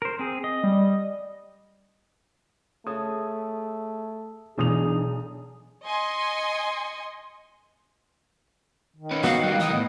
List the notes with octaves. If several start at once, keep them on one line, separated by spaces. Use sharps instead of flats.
A#4 C5
C4 G#4
D#5
G3
A3 G#4 C#5 D#6
B1 B2 E3 D4 D#4 G#4 D#6 F7
D#5 G#5 C6 C#7
D#3
C#4 B4
F#3 B3 D#4 F#4 F5
F#3 G3 F#6
E3 D#4 D#6
A2 B3